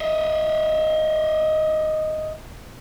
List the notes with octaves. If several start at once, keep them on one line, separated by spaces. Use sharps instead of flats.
D#5 E5